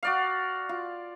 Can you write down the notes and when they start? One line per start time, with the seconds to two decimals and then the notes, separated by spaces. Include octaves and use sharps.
0.03 F#4 D5 F5
0.69 F4